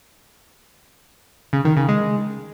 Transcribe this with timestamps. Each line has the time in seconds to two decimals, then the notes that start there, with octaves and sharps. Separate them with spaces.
1.53 C#3
1.65 D#3
1.77 C#3
1.89 G#3